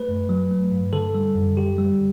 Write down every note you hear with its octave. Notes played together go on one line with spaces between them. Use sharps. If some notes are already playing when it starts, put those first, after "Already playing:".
Already playing: A3 B4
F#2
F#3
A3
G2
D3 A4
G3
F#2
D3 G4
G3